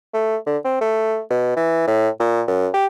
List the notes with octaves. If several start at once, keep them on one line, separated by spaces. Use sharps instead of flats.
A3
D3
C4
A3
B2
E3
A2
A#2
F#2
G4